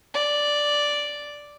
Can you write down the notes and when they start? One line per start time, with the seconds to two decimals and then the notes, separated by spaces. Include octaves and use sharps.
0.14 D5